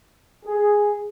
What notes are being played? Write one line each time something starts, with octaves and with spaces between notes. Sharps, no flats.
G#4